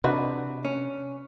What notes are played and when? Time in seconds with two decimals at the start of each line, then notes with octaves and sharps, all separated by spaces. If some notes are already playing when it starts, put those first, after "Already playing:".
0.04 C3 E3 D4 D#4 F#4 B4
0.65 C#4